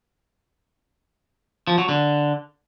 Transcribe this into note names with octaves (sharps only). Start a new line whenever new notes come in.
F3
F#3
D3